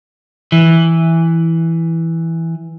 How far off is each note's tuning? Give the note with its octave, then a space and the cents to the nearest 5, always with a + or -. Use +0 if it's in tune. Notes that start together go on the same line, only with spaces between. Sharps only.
E3 -5